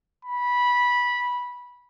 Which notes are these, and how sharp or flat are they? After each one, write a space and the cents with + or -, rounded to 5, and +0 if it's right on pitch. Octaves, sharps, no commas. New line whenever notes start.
B5 -15